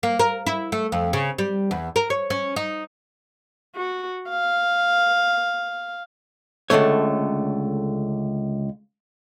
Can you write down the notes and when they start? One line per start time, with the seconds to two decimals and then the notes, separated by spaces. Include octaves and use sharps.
0.03 A#3
0.19 A#4
0.46 E4
0.72 A3
0.92 F2
1.13 C#3
1.38 G3
1.71 E2
1.96 A#4
2.10 C#5
2.30 C#4
2.56 D#4
3.76 F#4
4.29 F5
6.70 C#2 A#2 D3 A3 C#5